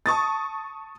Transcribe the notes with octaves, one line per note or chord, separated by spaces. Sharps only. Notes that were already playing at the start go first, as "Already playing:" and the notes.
A5 C#6 D#6 A6